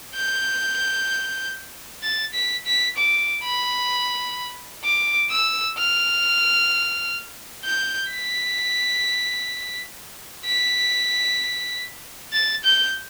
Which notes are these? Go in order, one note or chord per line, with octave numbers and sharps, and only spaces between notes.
G6
A6
B6
B6
D6
B5
D6
E6
F6
G6
B6
B6
A6
G6